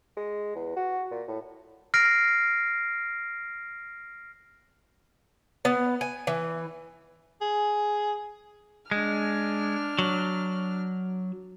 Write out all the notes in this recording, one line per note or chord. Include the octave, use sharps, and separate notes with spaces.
G#3
E2
F#4
A#2
A2
F6 A#6 C7 D7
B3
G#5
E3
G#4
G#3 D4 F6
F#3